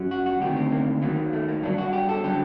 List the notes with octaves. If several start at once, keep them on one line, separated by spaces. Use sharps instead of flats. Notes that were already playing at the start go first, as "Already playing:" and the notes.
Already playing: F#2 F#3
F#4
F#4
D2 C3 D#3 G4
C4
A#3
D#2 D#3 F#3 A#3
A3
A#3
G2 F#3 D4
F#4
G4
A4
D3 F#3 G4